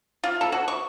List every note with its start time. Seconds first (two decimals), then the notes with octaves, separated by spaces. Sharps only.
0.24 F4
0.41 A4
0.52 F#4
0.68 C#6